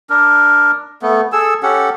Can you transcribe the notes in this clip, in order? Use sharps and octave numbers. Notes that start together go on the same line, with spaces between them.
D4 A#4
A3 B3
G#4 A4 E6
C#4 G4 A4 F#5